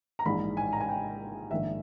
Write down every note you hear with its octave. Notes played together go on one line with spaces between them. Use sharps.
A#5
A#1 G#2 E3 B5
G#5
A#5
G#5
G5
A#1 G#2 D#3 E5